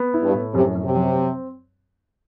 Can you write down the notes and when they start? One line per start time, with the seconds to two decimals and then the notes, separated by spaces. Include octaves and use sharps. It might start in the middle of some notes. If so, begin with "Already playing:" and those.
Already playing: B3
0.14 E4
0.23 G2
0.34 A2
0.54 F#2 C3
0.75 F#2
0.85 C3
0.94 F#3
1.16 C4